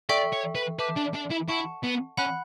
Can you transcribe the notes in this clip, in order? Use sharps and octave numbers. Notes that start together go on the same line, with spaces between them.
A4 D5 E5 G5 C#6
C#5
B4
B4 E5 A5 D6 G6
D4
D4
E4
E4 F#5 A5 C#6
B3
C#4 F#5 B5 F#6